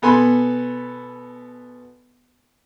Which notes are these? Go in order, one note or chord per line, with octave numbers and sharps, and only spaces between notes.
B2 B3 A4 G#5 B5 C6